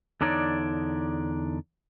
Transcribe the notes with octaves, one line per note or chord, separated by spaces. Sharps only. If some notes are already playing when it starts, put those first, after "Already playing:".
E2 D3 D4 D#4 C#5 D5